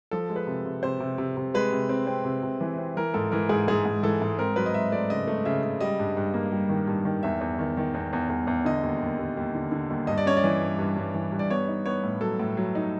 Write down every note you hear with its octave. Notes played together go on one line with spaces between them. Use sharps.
F3 A4
G#3
B4
C3
C3
C3 C5
C3
C3
C3
G#3 B4
C3
C4
C4
C3
C3
E3
C4
E3 A#4
G#2 A4
E3 A#4
G#2 G#4
G#2 G#4
G#2
E3 A4
G#2
C4 A#4
F#3 B4
D#5
F#3 E5
A3 D5
C#3 D#5
A3
C#3 E5
C#3
G3 D#5
G2
G2
A#3
G3
D#3
G2
D#3
E2 E5
E2
D#3
D#3
E2
E2
E2
E2
D3 D#5
D#2
D#2
D#2
D#2
D3
D3
D#2
G2 D#5
D5
C#4 C#5
D5
E3
G2
G2
G2
E3
G2
D5
B3 C#5
D#4
B3 C#5
A2
F#3 A4
A2
F#3
D#4